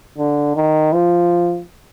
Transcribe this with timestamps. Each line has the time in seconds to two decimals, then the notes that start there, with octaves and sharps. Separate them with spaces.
0.18 D3
0.56 D#3
0.93 F3